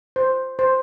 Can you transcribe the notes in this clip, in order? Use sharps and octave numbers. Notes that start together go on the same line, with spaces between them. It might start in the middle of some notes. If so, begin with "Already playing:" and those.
C5
C5